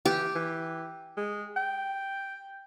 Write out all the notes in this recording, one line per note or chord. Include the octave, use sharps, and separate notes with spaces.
E3 G4
E3
G#3
G5